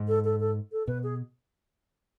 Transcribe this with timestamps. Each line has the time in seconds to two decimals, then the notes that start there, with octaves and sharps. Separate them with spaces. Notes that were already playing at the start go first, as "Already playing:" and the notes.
Already playing: G#2
0.08 A4
0.24 A4
0.40 A4
0.72 A4
0.87 B2 B4
1.03 G#4